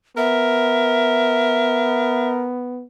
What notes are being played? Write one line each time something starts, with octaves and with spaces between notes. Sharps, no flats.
B3 A#4 E5